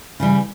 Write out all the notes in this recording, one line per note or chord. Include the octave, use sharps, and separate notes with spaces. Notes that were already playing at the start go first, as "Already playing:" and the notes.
C#3 E3 G3